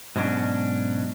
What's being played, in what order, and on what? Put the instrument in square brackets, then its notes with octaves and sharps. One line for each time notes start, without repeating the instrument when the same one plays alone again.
[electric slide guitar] G#2 B2 F#3 C#4 D4